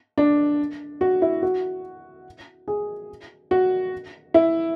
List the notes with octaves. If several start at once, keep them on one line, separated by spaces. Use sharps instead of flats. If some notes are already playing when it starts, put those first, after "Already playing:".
D4
F#4
E4
F#4
G#4
F#4
E4